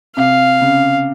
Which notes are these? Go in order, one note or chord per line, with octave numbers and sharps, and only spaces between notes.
C3 F5
C#3